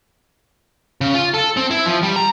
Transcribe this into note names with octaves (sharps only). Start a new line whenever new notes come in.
C#3
F4
A4
C4
E4
F3
G3
A#5